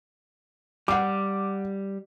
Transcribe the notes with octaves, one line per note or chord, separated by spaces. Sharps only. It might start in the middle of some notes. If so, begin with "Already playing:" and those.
G3 F5 F#5 D6